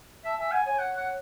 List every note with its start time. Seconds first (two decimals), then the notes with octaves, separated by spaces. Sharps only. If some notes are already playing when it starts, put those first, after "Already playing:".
0.25 E5 A5
0.38 E5 G#5
0.52 F#5 G#5
0.66 C#5 G#5
0.79 F#5
0.97 F#5